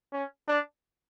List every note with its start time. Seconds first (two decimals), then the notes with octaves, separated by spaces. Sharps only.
0.13 C#4
0.48 D4